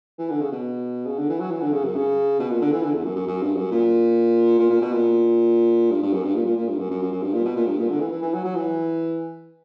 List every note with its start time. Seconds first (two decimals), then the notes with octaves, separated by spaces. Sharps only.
0.18 E3
0.30 D3
0.41 C#3
0.52 B2
1.06 C#3
1.18 D3
1.29 E3
1.40 F#3
1.51 E3
1.62 D3
1.73 C#3
1.84 F#2
1.95 C#3
2.39 B2
2.50 A#2
2.62 D3
2.72 E3
2.83 D3
2.94 E2
3.05 F#2
3.15 F#2
3.27 F#2
3.42 G2
3.56 F#2
3.71 A#2
4.59 A#2
4.70 A#2
4.81 B2
4.92 A#2
5.91 G2
6.03 G2
6.13 F#2
6.24 G2
6.35 A#2
6.46 A#2
6.57 A#2
6.68 G2
6.79 F#2
6.90 F#2
7.02 F#2
7.12 F#2
7.23 G2
7.34 A#2
7.45 B2
7.56 A#2
7.67 G2
7.78 A#2
7.90 D3
8.00 E3
8.12 E3
8.22 E3
8.34 F#3
8.44 F#3
8.56 E3